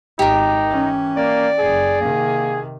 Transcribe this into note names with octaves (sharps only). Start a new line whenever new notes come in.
G#1 D#4 G4 A#4
E3 C#4
A#3 D5
F#1 G#4
C3 D#3 A#3